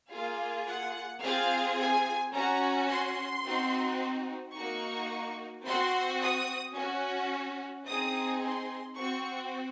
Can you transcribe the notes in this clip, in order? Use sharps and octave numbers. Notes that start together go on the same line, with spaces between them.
A#3 F4 G#4 F5
F#5
C4 F4 G#4 F5
G#5
C#4 F#4 A#5
C6
C4 D#4 F#4
A#3 D#4 F#4 C#6
C4 F#4 C6
D#6
C#4 F#4
C4 D#4 G#4 D#6
C6
C4 F#4 C#6